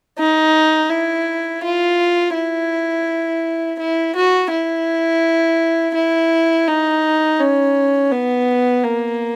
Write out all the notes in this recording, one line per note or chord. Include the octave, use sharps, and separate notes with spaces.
D#4
E4
F4
E4
E4
F#4
E4
E4
D#4
C#4
B3
A#3